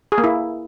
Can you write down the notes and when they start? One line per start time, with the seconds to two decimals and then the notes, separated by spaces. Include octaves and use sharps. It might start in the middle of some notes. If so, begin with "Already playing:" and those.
0.12 G#4
0.18 A#3
0.24 E4